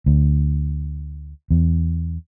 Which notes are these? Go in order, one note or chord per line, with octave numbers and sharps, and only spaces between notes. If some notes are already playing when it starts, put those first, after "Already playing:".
D2
E2